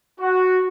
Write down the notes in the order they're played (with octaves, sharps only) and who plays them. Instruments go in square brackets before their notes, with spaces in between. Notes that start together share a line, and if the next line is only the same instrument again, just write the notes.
[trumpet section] F#4